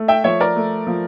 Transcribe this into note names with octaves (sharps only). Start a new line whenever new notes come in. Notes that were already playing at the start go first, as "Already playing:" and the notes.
Already playing: A3
E5 G5
F3 C#5 E5
A#4 D5
A3
F3